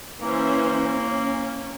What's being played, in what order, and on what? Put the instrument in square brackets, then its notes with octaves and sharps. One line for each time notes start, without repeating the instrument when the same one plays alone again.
[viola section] E3 C#4 C5 [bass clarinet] A#3
[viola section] C#4